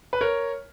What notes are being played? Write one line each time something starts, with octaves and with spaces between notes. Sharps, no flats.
B4
A#4 C#5